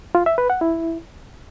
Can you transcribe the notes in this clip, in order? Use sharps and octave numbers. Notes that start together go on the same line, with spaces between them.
F4
E5
B4
F#5
E4